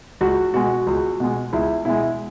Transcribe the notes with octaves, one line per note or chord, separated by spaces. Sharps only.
C#2 F#4
B2 G#3 F#4
C#2
B2 G#3
C#2 E4
B2 G#3 E4